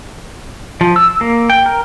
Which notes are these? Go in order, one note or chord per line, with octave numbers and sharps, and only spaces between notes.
F3
E6
A#3
G5
A#4